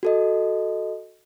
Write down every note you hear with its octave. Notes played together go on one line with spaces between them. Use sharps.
F#4 A4 D#5